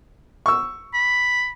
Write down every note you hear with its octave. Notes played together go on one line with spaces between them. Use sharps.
C#6 E6
B5